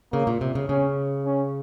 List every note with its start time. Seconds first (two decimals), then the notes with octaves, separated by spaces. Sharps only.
0.13 C#3 A#3
0.27 A#2
0.41 C3
0.55 C#3
0.69 C#3 C#4
1.26 C#4